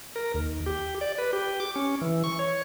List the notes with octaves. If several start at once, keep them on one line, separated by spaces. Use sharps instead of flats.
A#4
D#2
G4
D5
B4
G4
D6
C#4
E3
C#6
C#5